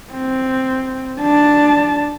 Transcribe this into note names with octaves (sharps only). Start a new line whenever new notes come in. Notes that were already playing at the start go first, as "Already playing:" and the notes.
C4
D4 A5